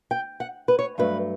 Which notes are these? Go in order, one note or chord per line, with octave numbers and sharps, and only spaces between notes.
G5
F#5
B4
C#5
G2 F#3 A3 B4